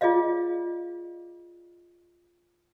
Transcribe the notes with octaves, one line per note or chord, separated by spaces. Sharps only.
F4 G#4 D5 D#5 F5